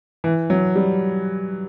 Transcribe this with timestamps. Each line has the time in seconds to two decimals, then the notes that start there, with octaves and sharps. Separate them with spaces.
0.24 E3
0.50 F#3
0.76 G3